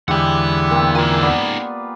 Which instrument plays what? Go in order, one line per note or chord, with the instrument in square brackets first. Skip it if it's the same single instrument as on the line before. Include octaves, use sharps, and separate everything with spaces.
[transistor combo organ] E2 D3 E3 [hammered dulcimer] G#3 G4 G#4 [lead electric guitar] F#5 B5
[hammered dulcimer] A#3 [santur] C4
[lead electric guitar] C#4 D#4 [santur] F4 A#4
[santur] B3 B5 [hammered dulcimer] D5